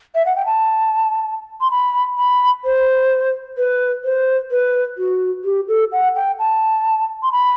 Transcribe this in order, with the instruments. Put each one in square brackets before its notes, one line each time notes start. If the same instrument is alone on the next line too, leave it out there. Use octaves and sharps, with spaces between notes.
[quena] E5
F#5
G5
A5
C6
B5
B5
C5
B4
C5
B4
F#4
G4
A4
F#5
G5
A5
C6
B5